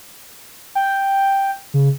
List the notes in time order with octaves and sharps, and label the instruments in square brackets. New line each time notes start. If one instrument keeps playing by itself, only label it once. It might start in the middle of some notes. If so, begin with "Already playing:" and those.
[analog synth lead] G5
[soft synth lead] C#3